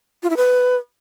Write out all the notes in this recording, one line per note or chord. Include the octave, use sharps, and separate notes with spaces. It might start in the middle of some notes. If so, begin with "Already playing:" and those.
F4
E4
B4